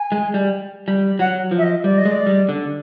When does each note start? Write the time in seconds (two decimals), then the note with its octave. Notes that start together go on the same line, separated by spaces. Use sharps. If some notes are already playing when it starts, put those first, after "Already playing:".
Already playing: G#5
0.12 G#3
0.34 G3
0.88 G3
1.19 F#3 F#5
1.51 F3
1.58 E5
1.62 D#5
1.84 G3 D5
1.98 D#5
2.05 G#3
2.11 D5
2.27 G3
2.49 D3